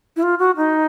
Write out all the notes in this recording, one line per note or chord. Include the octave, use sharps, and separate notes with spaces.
E4
F4
F#4
D#4